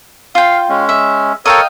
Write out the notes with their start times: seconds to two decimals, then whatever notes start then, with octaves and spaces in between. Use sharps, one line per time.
0.35 F4 F5 G5
0.69 G#3 C#4
0.89 E5
1.46 A4 A#4 C#5 D#5 F5 G5